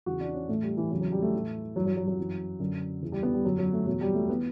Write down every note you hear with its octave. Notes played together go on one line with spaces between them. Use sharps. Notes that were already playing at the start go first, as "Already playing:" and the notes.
E2 C#3 E3 F#4
D4
C#4
A2 E3 A3
G3
E3
E2 C#3 E3 F#3
F#3
G3
A3
A2 E3
G2 E3 F#3
F#3
F#3
F#3
F#2 E3
F#2 D3
E2 C#3 E3
G3
B3
G3
F#2 D3 F#3
F#3
A3
E2 B2 F#3
G3
A3
E3 B3